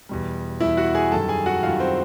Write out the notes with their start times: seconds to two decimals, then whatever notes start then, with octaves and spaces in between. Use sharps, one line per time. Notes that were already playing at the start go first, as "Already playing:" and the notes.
0.09 E2 B2 G3
0.60 E2 B2 G3 E4 E5
0.77 F#4 F#5
0.95 G#4 G#5
1.12 F#2 D#3 G3 A4 A5
1.29 G#4 G#5
1.46 F#4 F#5
1.63 F#2 D#3 G3 F4 F5
1.80 C4 C5